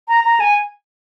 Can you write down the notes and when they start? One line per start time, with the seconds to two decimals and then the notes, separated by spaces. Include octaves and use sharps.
0.08 A#5
0.24 A#5
0.40 G#5